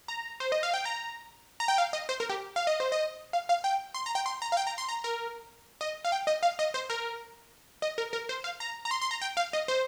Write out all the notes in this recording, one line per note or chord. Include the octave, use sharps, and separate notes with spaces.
A#5
C5
D#5
F5
G5
A#5
A#5
G5
F5
D#5
C5
A#4
G4
F5
D#5
C5
D#5
F5
F5
G5
C6
A#5
G5
C6
A#5
F5
G5
A#5
C6
A#5
A#4
D#5
F5
G5
D#5
F5
D#5
C5
A#4
D#5
A#4
A#4
C5
F5
A#5
A#5
C6
C6
A#5
G5
F5
D#5
C5